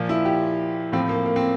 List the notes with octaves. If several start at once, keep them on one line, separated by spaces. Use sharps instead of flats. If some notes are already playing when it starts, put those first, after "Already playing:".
Already playing: A#2 F3
E4
G4
A2 F3 C4
A#3
A#3
C4